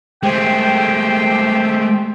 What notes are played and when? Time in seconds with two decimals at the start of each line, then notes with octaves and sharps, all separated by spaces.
0.23 G#3 A3 G4 C5 G5